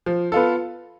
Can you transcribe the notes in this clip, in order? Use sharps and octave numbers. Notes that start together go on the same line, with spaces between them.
F3
B3 F4 A4